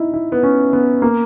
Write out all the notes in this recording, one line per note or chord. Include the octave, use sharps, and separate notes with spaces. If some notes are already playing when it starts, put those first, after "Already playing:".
Already playing: D#4 E4
E4
B3
C#4
B3
A#3